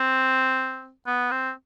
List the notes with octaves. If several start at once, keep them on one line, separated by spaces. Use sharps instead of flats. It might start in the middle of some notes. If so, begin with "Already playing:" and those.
Already playing: C4
B3
C4